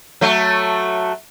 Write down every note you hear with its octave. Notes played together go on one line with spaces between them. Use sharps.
F#3 A3